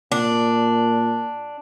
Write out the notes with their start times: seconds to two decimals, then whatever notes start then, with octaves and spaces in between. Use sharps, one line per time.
0.12 A#2 D4